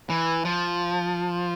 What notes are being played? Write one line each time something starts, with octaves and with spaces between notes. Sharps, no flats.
E3
F3